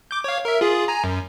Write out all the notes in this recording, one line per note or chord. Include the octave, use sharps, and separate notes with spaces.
D6 G6
C#5 F5
A#4 E5
F4 G#4
G#5 A#5
F#2